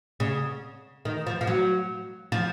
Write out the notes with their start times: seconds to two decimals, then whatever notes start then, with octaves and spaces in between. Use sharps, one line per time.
0.20 C#3
1.05 D#3
1.27 F3
1.41 F3
1.47 F#3
2.32 F3